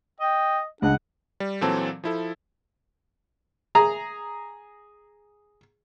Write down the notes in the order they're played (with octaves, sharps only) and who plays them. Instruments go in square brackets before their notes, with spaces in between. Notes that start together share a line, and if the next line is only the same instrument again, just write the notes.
[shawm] D#5 [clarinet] G5
[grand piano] C#2 [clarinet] D4 [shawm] F#5
[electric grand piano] G3
A#2 E3 F#3 C4 A4 A5
F3 E4 A4
[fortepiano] G#4 A#5